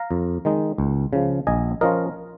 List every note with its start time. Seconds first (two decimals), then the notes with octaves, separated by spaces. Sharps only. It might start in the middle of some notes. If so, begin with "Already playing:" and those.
Already playing: F5 A#5
0.11 F2
0.45 D#3 G#3 D#4
0.78 C#2
1.13 C#3 F3
1.47 A#1 D#5 G#5
1.81 F3 C#4 F4 A#4 D#5